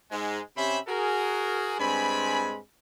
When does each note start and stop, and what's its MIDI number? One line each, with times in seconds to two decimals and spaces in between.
0.11 0.40 44
0.11 0.40 56
0.57 0.78 48
0.57 0.78 61
0.57 0.78 67
0.57 0.78 72
0.57 0.78 76
0.57 0.78 83
0.88 1.75 66
0.88 1.75 68
0.88 1.75 70
1.79 2.58 43
1.79 2.58 56
1.79 2.58 60
1.79 2.58 80
1.79 2.58 83